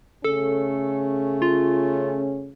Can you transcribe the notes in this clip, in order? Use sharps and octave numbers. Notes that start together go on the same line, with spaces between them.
C#3 A3 C#4 A4
F4